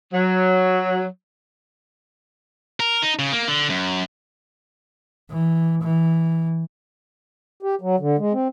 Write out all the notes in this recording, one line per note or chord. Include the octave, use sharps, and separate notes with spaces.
F#3
A#4
D#4
C#3
A#3
D3
F#2
E3
E3
G4
F#3
D3
G#3
C4